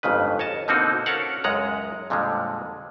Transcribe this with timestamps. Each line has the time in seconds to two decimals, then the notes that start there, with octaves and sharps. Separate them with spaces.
0.03 G1 F2 G#2 C#3 B4
0.39 C#5 D#5 A5
0.68 B2 D3 A#3 C4 D#4 F#4
1.06 C#4 F#4 A4 A#4 F5 F#5
1.44 C#2 F#2 G#3 F#5 A#5
2.10 F2 A#2 D3 G3 G#3